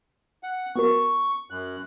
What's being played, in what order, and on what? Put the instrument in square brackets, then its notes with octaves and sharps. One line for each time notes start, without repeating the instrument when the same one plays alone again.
[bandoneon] F#5
[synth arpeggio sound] B3 F#4 A#4 [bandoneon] C#6
[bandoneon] F#2 F#6